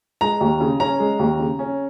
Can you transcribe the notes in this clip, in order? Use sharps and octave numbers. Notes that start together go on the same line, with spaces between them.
G#3 A#5
D#2
C#3
C#4 A#5
G#3
D#2
C#3
C#4